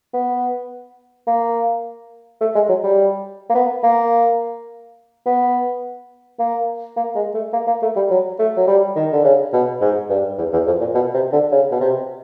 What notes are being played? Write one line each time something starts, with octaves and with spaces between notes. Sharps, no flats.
B3
A#3
A3
G#3
F#3
G3
A#3
B3
A#3
B3
A#3
A#3
G#3
A3
A#3
A#3
A3
G3
F#3
A3
F#3
G3
D#3
D3
C#3
B2
G#2
G2
E2
E2
F2
A#2
B2
C3
D3
C#3
B2
C3